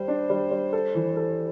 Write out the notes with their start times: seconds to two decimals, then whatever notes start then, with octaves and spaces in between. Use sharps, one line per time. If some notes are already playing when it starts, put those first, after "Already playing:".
Already playing: G3 C5
0.08 D4
0.30 G3
0.51 G3
0.73 A4
0.95 E3
1.17 A4